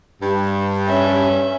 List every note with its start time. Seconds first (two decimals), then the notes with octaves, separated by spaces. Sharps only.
0.22 G2
0.87 C#4 E5